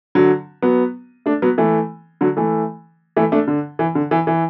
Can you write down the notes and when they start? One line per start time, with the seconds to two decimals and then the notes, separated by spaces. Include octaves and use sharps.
0.15 D3 F#3
0.62 F#3 B3
1.26 A3 D4
1.42 F#3 B3
1.58 E3 A3
2.21 D3 F#3
2.37 E3 A3
3.16 E3 A3
3.32 A3 D4
3.48 D3
3.79 E3
3.95 D3
4.11 E3
4.27 E3